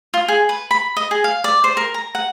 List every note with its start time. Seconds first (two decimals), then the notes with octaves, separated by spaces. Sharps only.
0.14 F4
0.28 G#4
0.49 B4
0.71 B5
0.96 D#5
1.11 G#4
1.24 F5
1.44 D5
1.64 C5
1.77 A#4
1.94 A#5
2.15 F#5